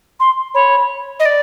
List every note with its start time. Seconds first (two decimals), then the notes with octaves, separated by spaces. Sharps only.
0.20 C6
0.54 C#5 B5
1.20 D#5
1.26 D5